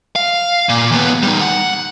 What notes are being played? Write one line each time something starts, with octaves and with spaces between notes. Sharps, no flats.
F5
A#2
D#2 B3
G3 D#4
F#5